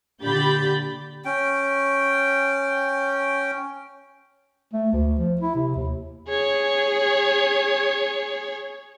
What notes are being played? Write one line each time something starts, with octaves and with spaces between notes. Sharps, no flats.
A#2 D3 G4 B5 G6 A6
C#4 G5
A3
D2
F3
E4
C3
D#2
G#4 C#5